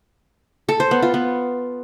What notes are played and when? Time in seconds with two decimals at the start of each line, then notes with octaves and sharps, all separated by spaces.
0.69 A4
0.80 C5
0.91 B3
1.02 F4
1.14 B3